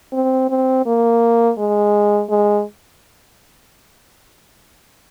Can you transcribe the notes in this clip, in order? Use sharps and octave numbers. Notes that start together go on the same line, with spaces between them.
C4
C4
A#3
G#3
G#3